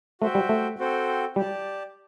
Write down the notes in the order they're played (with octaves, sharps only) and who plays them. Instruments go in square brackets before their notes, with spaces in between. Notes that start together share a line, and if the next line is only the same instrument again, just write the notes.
[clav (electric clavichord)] A3 [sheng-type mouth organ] F#4 C5 E5 G5
[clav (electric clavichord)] G3
A3
[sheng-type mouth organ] C4 F#4 A4 C5 G5
[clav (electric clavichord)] G3 [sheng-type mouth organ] G4 D5 A5